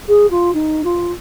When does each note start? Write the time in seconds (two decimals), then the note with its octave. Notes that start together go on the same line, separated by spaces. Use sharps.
0.08 G#4
0.30 F4
0.53 D#4
0.84 F4